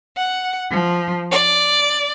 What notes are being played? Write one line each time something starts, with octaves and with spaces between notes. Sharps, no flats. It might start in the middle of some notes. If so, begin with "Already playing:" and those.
F#5
F3
D5